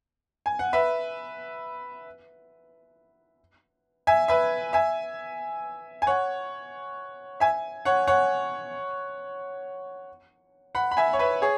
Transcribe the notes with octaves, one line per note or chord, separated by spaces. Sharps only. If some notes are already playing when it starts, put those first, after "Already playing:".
G#5
F#5
B4 E5
E5 G#5
B4 E5
E5 G#5
G#5
C#5 F#5
E5 G#5
C#5 F#5
C#5 F#5
F#5 B5
B5
E5 G#5
C#5
B4 E5
G#4 C#5